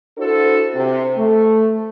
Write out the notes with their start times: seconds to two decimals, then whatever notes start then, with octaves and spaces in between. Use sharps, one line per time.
0.18 D4 E4 F#4 A4 C5
0.74 C3
1.17 A3